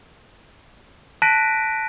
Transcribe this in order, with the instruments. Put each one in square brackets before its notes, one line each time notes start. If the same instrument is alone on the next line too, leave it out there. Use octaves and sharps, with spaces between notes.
[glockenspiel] A5 F#6 A#6 B6 D7 D#7